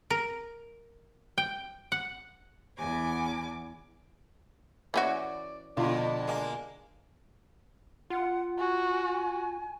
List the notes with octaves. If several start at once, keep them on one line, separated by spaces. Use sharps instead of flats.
A#4
G5
F#5
E2 G#5 D6
E3 C#4 F#4 D5
F2 B2 D3 D4 F4
G#3 A#3
F4 F#5
F#4 G#5